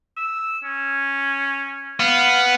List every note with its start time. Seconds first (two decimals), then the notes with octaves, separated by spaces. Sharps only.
0.17 E6
0.64 C#4
2.00 B3 F5